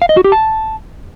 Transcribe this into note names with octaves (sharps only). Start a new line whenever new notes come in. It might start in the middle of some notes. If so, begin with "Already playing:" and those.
F5
D#5
F#4
G4
A5